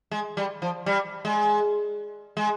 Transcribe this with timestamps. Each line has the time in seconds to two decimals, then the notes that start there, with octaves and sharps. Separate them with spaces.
0.11 G#3
0.37 G3
0.62 F3
0.86 G3
1.25 G#3
2.37 G#3